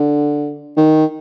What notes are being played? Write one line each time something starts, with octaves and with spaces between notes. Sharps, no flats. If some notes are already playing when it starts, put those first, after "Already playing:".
Already playing: D3
D#3